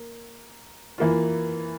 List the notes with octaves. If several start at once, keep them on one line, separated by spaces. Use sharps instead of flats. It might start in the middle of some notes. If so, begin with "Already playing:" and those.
Already playing: A#3
E3 A#3 F4